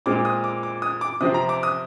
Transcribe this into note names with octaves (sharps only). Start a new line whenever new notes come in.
A#2 G#3 C4 D6
D#6
D6
D6
D#6
D6
C3 F3 C4 D#6
A#5
D6
D#6